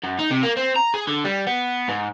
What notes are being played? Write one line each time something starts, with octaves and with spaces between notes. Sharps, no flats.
F#2
D#4
C3
A#3
C4
A#5
G#4
D3
G3
B3
G#2